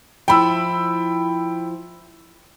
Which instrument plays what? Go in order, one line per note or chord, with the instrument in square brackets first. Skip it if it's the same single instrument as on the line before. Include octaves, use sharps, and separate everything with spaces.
[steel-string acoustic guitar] F3 E4 [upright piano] G5 B5 E6